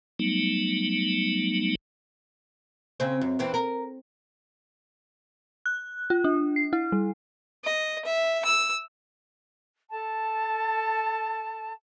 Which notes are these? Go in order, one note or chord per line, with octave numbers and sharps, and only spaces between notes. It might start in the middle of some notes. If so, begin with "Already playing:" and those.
F#3 G3 A3 B3 D#4
C#3 C4
F#2
E2 E3 C4
A#4
F#6
F4
D4
C7
E4
G3
D#5
E5
E6
A4 A5